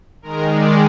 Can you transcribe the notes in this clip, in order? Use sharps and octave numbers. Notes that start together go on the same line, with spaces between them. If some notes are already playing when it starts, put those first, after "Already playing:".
D#3 G#3 A#4
D5